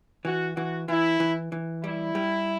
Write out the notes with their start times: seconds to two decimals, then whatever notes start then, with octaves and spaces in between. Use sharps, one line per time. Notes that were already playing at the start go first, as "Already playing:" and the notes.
0.25 E3 F#4
0.56 E3 F#4
0.88 E3 E4
1.20 E3
1.52 E3
1.84 G3 E4
2.15 G3